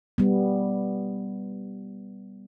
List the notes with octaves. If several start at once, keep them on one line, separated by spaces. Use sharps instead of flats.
G3 B3